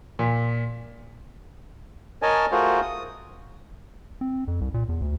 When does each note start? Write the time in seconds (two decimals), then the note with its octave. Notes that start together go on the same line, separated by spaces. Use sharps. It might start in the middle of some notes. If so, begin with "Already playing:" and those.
0.19 A#2
2.22 A#4 C#5 D#5 G#5 A5
2.52 A3 F4 F#4 G#4 A#4 C5
2.82 D#6
4.21 C4
4.48 F2
4.61 C2
4.74 A#2
4.89 E2
5.02 D2